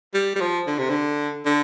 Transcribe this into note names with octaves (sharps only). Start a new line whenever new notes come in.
G3
G3
F3
D3
C3
D3
D3